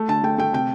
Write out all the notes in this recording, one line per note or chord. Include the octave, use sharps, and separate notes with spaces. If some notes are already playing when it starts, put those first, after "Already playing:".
Already playing: A3
D3 A5
A3 G5
A3 G5
C3 G5